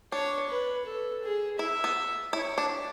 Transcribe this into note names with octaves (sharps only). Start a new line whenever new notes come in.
D4 C#5
B4
A4
G#4
E4 E5
B3
E4 C#5
D4